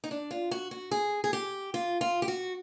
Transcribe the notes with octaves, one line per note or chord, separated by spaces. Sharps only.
D#4
D4
F4
F#4
F#4
G#4
G#4
G4
F4
F4
G4
F#4